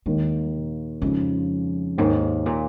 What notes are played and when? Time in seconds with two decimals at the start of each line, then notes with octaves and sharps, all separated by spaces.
0.06 D#2 D#3 G#3 A#3
0.54 A#2
1.01 F2 C#3 F3 G#3 D#4
1.98 D#2 G#2 D#3 A#3
2.46 A#2